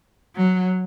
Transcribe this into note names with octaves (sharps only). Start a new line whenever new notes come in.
F#3